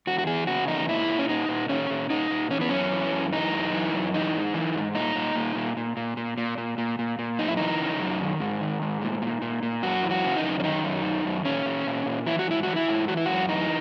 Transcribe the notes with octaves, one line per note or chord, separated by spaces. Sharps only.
E2 F#4
F#4
E3 G#4
C#3 F#4
E2 D#4
A#2 E4
A#2
C#4
A#2 D#4
A#2
A#2 C#4
A#2
A#2 D#4
A#2
E3 C#4
B3
F#2 C#4
E3
F#2
E3 D#4
F#2
E3
F#2
E3 D#4
G#2
E3
G#2
A#2 D#4
A#2
A#2
A#2
A#2
A#2
A#2
A#2
A#2
A#2
A#2
A#2
F#2 D#4
E4
E3 D#4
C#3
F#2
D#3
G#2
D#3
G#2
A#2
A#2
A#2
A#2
F#2 F#4
E3
F#4
C#3
D#4
F#2
C#4
D#3 D#4
F#2
D#3
F#2
A#2 C#4
A#2
A#2
A#2
E3 E4
F#4
G#2 E4
E3 F#4
E4
G#2
E3 F#4
E4
F#2 F#4
E3 D#4